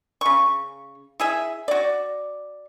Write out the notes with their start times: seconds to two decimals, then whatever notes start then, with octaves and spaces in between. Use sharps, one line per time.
0.21 C#3 C#6
1.20 E4 G#4 E5
1.68 F#4 D5